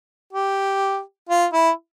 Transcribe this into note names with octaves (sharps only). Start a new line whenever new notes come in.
G4
F4
E4